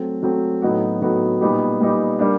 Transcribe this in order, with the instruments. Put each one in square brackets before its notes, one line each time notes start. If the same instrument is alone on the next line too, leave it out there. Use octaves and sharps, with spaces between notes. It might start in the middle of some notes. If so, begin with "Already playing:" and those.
Already playing: [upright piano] F#3 A3 C4
F#3 A3 C4
A2 F#3 B3 D#4 F#4
A2 F#3 B3 D#4 F#4
A#2 G3 B3 D#4 G4
A#2 G3 B3 D#4 G4
G3 A#3 D4